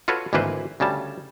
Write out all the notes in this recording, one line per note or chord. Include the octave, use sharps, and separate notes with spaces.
F4 F#4 A4 B4 C#5
G#1 D2 E3 A#3 B4 C5
D2 C#3 G3 A5